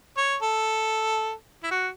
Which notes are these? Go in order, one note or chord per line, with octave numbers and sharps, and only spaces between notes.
C#5
A4
E4
F#4